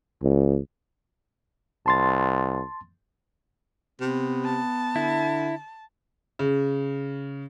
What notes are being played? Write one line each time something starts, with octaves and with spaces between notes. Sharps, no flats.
C#2
C2 A5 C6 A6
C3 B3
A5
D3 E4
C#3